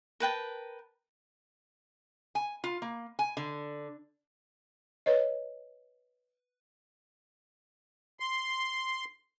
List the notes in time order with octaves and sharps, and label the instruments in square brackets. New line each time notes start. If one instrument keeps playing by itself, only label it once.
[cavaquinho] A#4 B4 G5 A5
[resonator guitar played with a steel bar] G#5
F4
A#3
G#5
D3
[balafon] B4 C#5 D#5
[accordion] C6